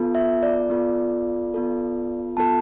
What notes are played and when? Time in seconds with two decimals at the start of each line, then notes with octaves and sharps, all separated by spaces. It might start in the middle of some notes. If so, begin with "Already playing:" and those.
Already playing: B3 F4 A4
0.15 E5
0.43 D5
0.70 B3 F4 A4
1.54 B3 F4 A4
2.37 B3 F4 A4 A5